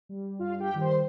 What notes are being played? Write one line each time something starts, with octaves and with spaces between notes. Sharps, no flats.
G3
G2 F4 F5
G4 G5
D#3 G3
C5 C6